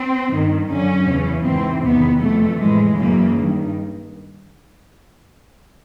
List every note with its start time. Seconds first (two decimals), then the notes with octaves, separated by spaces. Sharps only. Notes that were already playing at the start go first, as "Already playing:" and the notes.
Already playing: C4
0.32 G2 D#3
0.70 F#2 D3 C#4
1.08 E2 C#3 E3
1.45 G#2 E3 C4
1.84 E2 C3 D#3 B3
2.22 F2 C3 E3 A3
2.60 A2 E3 G#3
2.98 F#2 C#3 E3 A#3
3.36 G2 D#3